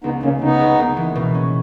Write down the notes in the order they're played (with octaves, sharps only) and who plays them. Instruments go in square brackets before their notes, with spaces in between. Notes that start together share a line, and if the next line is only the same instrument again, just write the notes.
[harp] C#2 [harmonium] B3 D#4
[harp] C#3 [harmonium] A#3 C#4
[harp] C#3 [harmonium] B3 D#4
[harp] C#2
A#3
E3
B2
C#4